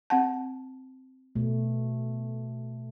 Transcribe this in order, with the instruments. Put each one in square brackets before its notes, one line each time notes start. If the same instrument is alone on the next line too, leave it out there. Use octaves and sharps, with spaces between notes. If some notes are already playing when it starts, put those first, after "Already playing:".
[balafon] C4 F#5 A5
[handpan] B2 A3